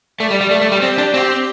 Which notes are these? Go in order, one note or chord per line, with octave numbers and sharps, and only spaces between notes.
A3 D5
G3
G3
A3
A3
G3
C4 G4
D4
C4 G4